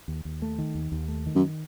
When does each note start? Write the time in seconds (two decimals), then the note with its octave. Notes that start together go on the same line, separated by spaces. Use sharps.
0.08 D#2
0.25 D#2
0.42 A3
0.59 D#3
0.75 D#2
0.92 D#2
1.08 A3
1.26 D#3
1.35 F#2